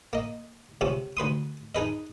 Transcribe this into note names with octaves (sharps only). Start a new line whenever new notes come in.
A#3 D#5
C#2 C3 C4 C#4
D2 B4 C6 D#6
D#4 G#4 B4 D#5